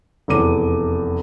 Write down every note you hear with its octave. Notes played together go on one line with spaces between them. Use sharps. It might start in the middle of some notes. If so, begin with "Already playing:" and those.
F1 E2 D6 D#7